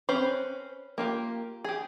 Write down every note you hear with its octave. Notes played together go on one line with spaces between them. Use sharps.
C4 C#4 B4 C5
A#3 F4 G4
G4 G#4